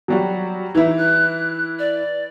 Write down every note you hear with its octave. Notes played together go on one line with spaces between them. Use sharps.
F#3 G3 F#4
E3 D#4 E4
F#6
D5